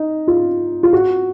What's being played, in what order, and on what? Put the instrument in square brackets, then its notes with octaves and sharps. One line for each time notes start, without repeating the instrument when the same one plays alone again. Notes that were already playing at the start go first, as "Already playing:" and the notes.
Already playing: [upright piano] D#4
F4
F4
F#4